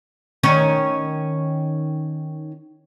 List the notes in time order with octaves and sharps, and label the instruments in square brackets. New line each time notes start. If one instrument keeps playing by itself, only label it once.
[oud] D#3 C#4 C#5